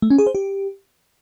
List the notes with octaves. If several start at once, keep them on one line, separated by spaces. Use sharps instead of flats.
A3
C#4
G#4
C5
G4